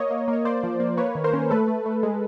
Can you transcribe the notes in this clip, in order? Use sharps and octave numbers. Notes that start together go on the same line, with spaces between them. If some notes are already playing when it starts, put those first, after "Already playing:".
Already playing: A#3 C#5 D#5
A#3
A#3
C#5
A#3 C5 D5
F3
A#3
A#3 B4 C#5
D#3
A#4 C5
C#4
A3 A4 B4
A3
A3
G#3